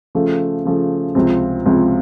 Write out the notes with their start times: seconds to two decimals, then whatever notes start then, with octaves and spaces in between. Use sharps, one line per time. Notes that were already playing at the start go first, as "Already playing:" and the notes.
0.15 C#3 F3 A3
0.65 C#3 F3 A3
1.15 C#2 C3 F3 C4
1.65 C#2 C3 F3 C4